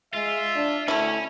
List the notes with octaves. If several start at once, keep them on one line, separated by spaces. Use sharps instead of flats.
G#3 F4 E5
D4
D2 A3 C#4 E4